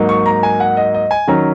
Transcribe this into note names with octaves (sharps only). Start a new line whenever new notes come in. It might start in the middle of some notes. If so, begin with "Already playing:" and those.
Already playing: G#2 F#3 A#3 D#4
C#6
A#5
G#5
F#5
D#5
D#5
G#5
D#3 F#3 C#4 A#5